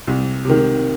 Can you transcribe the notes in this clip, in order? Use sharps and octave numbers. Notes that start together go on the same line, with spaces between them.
C2
C3 D#3